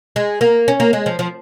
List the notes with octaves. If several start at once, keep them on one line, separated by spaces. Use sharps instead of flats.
G#3
A#3
C#4
A#3
G#3
F3
F3